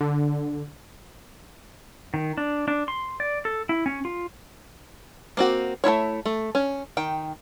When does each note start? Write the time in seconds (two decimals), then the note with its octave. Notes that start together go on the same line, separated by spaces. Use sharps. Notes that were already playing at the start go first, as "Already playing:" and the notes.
0.01 D3
2.14 D#3
2.38 D4
2.68 D4
2.88 C6
3.20 D5
3.45 A4
3.69 E4
3.86 C#4
4.05 F4
5.37 A#3 C4 F#4
5.84 A3 A#3 E4 C#5
6.26 A3
6.55 C#4
6.97 D#3 G5